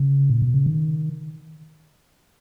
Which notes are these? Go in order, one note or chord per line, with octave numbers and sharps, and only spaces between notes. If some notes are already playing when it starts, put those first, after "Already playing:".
Already playing: C#3
A#2
B2
C#3
D#3